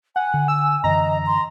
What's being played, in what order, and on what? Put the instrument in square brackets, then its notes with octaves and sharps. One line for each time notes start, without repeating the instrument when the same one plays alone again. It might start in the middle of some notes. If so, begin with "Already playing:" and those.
[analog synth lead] F#5 [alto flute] G#5
[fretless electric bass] D3
[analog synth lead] E6
[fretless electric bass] F#2 D3 E3 [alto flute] D#5 [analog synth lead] A#5
[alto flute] C6